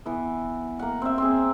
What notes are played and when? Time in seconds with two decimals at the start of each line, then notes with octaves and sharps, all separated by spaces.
0.06 E3 B3
0.79 A#3 F#5
1.02 C4 E5
1.18 C4 G#4